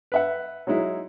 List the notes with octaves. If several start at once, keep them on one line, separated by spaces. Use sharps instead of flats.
B4 E5 F#5
F#3 G#3 D#4 E4